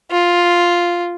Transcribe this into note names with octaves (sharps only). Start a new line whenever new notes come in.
F4